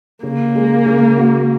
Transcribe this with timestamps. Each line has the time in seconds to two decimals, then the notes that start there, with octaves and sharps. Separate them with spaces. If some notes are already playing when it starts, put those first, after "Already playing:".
0.23 C#3 A#3
0.55 G#3
0.86 C#3
1.17 F#4